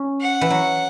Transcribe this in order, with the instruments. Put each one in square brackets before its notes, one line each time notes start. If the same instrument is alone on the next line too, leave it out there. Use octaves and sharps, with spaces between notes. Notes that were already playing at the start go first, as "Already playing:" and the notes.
Already playing: [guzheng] C#4
[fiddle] F#5
[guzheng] E3
F#3